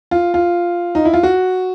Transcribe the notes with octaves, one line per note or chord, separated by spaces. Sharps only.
F4
F4
D#4
E4
F4
F#4